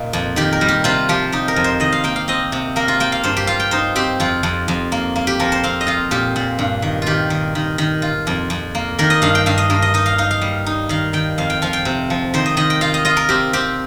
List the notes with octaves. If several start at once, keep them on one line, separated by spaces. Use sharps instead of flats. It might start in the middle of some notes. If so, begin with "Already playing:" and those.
Already playing: A#2 D#4
F2
D#3 G4
A#4
G3
G4
C3 F4
F3 G4
D#4 G4
A#4
F2
C5
D#3 D#5
F5
A#3 G5
F5
C4 D#5
C3
A#3 A#4
F4
A#3 G5
F5
G2 C5
G4
F4 F5
G5
D#4 C5
C4 G4
F2 F4
F2
F2
A#3
A#3
G4
F3 A#4
C5
C4 F5
D#5
F4 F5
A#2 G4
A#2
G2
D#3
D#3 F4 G4
D#3
D#3
D#3
F4
F2
F2
A#3
D#3 A#4
D#5
G2 F5
G5
G2 F5
D#5
G2 A#4
D#5
D#4 D#5
F5
D#4 F5
F5
G3
D#4
D#3 F5
D#3 G5
F2 F5
G5
F3 F5
G5
C3
F3
D#3 C5
D#5
D#3 D#5
G5
F4 F5
D#5
F4 D#5
A#4
C4 G4
C4 G4